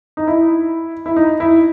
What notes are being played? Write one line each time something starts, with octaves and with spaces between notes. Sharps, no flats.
D#4
E4
E4
D#4
E4